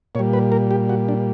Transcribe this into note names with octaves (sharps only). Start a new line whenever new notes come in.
A#2 G3 C#5
B4
A#4
G4
F#4
D4